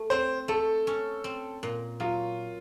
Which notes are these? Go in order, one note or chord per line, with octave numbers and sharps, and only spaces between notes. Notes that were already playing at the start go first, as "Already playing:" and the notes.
Already playing: A3
C4 C5
A3 A4
C#4
C4
A#2
F#3 F4